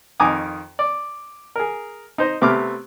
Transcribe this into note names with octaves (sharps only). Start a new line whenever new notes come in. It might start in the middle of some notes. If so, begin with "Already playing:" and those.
F2 D#3 G#5 A#5 D6 D#6
D5
G#4 A#4
D#4 C5 D#5
C3 A3 B3 D6 F6